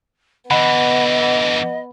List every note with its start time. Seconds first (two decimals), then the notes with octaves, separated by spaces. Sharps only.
0.51 D3 E3 B3 D#5 F#5 B5